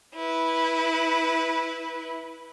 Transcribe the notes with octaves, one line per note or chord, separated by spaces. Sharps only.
E4 B4